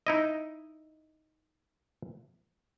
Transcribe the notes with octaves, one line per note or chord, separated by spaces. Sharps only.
D#4 E4 D#5